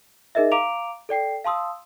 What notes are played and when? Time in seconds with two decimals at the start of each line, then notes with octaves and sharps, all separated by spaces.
0.35 D#4 G#4 A#4 D#5 E5
0.52 F5 A#5 D6 D7 F7
1.09 A4 D5 G5 C7
1.44 F5 A5 C6 D#6 E6